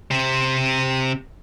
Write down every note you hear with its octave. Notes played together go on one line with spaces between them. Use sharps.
C3 C4